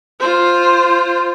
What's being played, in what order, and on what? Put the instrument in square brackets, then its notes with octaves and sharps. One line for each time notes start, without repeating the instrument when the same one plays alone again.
[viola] F4 C5